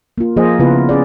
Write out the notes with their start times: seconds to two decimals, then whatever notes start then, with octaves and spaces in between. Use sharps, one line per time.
0.18 A#3 F4
0.36 F3 A#3 G#4 C5 D#5
0.59 C#3 B3 E4 F4 B4
0.89 C#4 G#4 D5